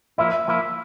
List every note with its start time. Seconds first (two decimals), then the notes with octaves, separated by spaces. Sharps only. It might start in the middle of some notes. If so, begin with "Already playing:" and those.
0.18 F3 A#3 E4 E5
0.48 F3 A#3 E4